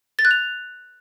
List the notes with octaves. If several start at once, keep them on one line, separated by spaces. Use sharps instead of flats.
A6
F#6
F7